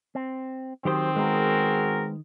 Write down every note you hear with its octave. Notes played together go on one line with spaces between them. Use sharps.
C4
D#3 F#3 C4 G4 C5
G#3 B3 F#4 G#4 A#4